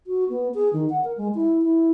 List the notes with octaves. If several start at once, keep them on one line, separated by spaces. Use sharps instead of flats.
F#4
B3
G#4
D#3
F#5
A#4
G#3
E4
E4